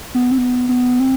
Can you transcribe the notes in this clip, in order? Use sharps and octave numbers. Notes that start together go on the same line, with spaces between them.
B3
C4
B3
B3
C4